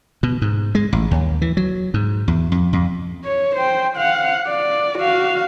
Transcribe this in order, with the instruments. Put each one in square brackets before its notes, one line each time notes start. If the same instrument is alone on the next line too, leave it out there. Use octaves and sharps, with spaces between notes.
[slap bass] B2
G#2
G#3
A1
D#2
E3
F#3
G#2
E2
F2
F2
[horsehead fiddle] C#5
C5 G5
F5 F#5
D5
F#4 F5